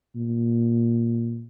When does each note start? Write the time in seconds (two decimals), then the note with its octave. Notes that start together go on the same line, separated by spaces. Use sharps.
0.15 A#2